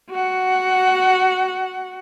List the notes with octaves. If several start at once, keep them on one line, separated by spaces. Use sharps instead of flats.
F#4 F#5